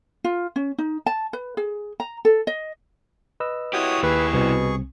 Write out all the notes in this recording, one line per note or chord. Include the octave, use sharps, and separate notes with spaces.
F4
C#4
D#4
A5
B4
G#4
A#5
A4
D#5
B4 D#5 E6
E4 F#4 G4 C#5 D#6
D#2 G#4 B4 C#6
C2 B2 C4